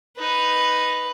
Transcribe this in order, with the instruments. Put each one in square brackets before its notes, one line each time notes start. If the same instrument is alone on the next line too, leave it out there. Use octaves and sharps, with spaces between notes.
[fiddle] D#4 [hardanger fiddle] B4